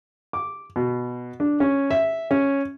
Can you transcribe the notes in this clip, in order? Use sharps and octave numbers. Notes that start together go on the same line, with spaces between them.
D6
B2
D4
C#4
E5
C#4